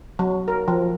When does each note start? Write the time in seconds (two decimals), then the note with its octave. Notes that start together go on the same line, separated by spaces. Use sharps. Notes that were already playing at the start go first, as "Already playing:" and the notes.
0.19 F#3
0.48 A#4
0.68 F3